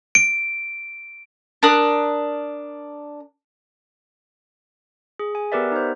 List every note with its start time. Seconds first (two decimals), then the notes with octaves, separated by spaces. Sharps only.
0.15 D7
1.63 D4 A#4 D#6 F#6
5.19 G#4
5.35 G#5
5.52 B3 G4 A#4 B4 D5 E5
5.72 D#4 C5